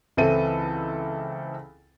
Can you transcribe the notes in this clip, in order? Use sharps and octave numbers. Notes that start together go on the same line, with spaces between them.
C#2 E3 C4 E4 A4 D#7